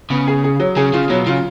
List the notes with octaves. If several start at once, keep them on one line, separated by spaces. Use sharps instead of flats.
C#3 B3
G#4
G#4
F#3
C#3 G#4
C#3 F4
B2 F#3
C#3 F4